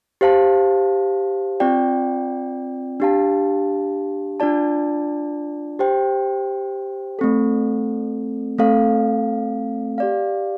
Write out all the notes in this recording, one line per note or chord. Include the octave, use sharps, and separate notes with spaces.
G4 C5 F5 A5
C4 F4 D5 G5
D4 G4 F5 A5
D4 F4 D5 A5
G4 C5 G5
A3 C4 A4
A3 C4 A4 F5
G4 D5 F5